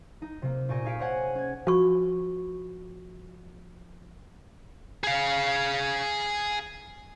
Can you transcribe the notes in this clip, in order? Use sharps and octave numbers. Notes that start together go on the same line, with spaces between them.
D#4
C3 A#3
A#2 G4 G#5 C#6 A#6 D#7
D#4 G#4 F5 B6 C#7 D7
G#4 C5 C#5 D#5 F#5 G#5
C#4 G#6
F3 F#4 C#6
G#4 F5